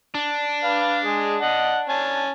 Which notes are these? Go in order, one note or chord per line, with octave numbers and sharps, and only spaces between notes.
D4
B4 F5
G#3 G#4
D#5 F#5
C#4 G#5 A5